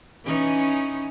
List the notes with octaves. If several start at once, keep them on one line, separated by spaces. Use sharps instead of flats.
E3 C#4 D#4